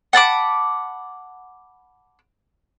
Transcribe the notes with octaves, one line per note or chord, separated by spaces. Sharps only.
F#5 A5 B5 D6